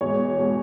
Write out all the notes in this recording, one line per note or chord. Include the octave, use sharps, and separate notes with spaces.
E2 B2 G#3 C#5
B2 G#3